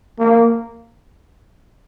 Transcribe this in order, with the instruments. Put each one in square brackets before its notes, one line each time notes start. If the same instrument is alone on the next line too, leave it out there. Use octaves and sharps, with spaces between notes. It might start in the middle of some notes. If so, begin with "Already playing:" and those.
[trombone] A#3